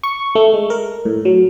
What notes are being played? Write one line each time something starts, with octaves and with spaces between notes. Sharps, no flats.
C#6
A3
G#3
A#4
A2
F#3